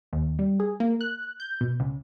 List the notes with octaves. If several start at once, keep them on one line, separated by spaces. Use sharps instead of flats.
D#2
G3
G#4
A#3
F#6
G6
B2
C#2